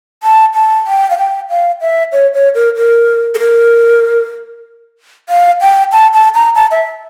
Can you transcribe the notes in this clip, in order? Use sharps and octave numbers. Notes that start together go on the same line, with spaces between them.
A5
A5
G5
F5
G5
F5
E5
C#5
C#5
A#4
A#4
A4
A#4
F5
G5
A5
A5
A#5
A5
E5